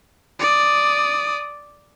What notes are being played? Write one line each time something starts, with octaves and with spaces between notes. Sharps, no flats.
D5 D#6